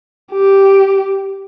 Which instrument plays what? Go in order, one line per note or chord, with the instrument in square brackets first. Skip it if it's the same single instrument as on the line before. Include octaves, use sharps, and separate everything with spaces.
[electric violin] G4